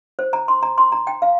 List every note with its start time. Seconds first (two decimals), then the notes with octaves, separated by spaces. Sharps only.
0.19 C5
0.33 A#5
0.48 C6
0.63 A#5
0.78 C6
0.92 A#5
1.07 G5
1.22 F5